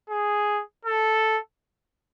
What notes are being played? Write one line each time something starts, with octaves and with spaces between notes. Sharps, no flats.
G#4
A4